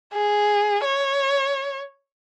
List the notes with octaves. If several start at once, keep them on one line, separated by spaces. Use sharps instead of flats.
G#4
C#5